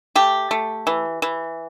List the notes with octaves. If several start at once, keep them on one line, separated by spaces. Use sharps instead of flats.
A3 G4
A3
E3
E3